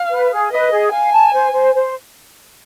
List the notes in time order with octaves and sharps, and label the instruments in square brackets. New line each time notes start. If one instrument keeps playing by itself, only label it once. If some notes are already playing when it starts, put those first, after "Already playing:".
Already playing: [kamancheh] F5
[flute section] B4
G#4
[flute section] B4 [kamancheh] D#5
[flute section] G#4
[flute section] F5 [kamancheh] G#5
[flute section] A5
C5
C5
C5